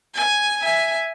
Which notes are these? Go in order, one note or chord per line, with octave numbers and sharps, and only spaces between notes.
G#5
E5 G#5